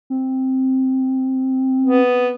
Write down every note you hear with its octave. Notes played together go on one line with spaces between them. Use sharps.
C4
B3